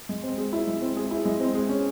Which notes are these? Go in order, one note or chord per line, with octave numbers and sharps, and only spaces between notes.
G#3
C4
G#4
E4
G#3
C4
G#4
E4
G#3
C4
G#4
C#4